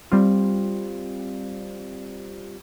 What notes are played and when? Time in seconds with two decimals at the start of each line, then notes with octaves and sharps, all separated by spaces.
0.12 G3 C4 F4